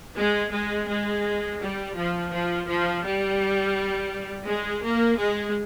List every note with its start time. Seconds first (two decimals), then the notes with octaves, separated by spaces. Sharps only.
0.15 G#3
0.51 G#3
0.88 G#3
1.60 G3
1.95 F3
2.32 F3
2.67 F3
3.03 G3
4.47 G#3
4.83 A#3
5.19 G#3